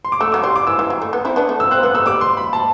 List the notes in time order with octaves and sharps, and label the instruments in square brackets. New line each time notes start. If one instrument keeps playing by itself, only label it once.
[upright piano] C6
D6
[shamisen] A3 [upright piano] E6
[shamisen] F#3 [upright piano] D6
[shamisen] G3 [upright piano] C6
[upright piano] D6
[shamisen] E3 [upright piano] E6
[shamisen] E3
F#3
A3
B3
C4 E4
B3 D4
A3
[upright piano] E6
[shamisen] C4 [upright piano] F#6
[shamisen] B3 [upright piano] F#6
[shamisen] A3 [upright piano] E6
[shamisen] G3 [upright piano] D6
[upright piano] C6
B5
A5